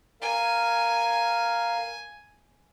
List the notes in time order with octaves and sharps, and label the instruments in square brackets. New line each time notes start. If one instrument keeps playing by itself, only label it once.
[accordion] A#4 F5 [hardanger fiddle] G#5